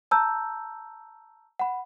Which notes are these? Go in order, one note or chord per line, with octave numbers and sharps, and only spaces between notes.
A5 A#5 E6 G6
F#5 B5